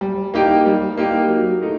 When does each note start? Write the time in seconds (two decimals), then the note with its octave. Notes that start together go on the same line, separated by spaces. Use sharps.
0.01 G3
0.34 A#3 D#4 G4
0.66 G3
0.97 A#3 D#4 G4
1.29 F#3
1.62 A3 D#4